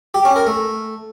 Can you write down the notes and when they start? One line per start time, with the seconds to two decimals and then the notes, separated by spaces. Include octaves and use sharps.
0.14 G4
0.25 C#4
0.36 A#4
0.47 A3